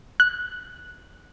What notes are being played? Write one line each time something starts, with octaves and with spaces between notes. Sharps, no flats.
F#6